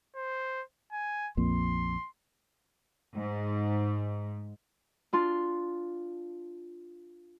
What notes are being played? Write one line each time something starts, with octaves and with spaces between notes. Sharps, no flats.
C5
G#5
A#1 F2 A#2 C6
G#2
D4 F4 C6